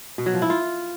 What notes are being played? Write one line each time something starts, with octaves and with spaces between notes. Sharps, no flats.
B2
F#3
F3
E4
F4